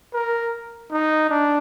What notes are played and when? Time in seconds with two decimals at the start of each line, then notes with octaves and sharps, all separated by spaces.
0.14 A#4
0.92 D#4
1.30 D4